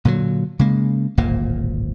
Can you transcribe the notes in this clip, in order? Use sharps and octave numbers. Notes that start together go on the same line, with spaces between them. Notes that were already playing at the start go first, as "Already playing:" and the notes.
A#2 D3 F3 F#3
C#3 G#3 A#3
D1 G#1 A#2 A#3